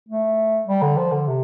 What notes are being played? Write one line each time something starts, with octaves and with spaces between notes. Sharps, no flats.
A3
G3
D3
F3
D3
C3